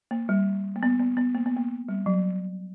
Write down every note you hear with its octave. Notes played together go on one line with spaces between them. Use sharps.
A#3
G3
A#3
B3
B3
B3
A#3
B3
A#3
G3
F#3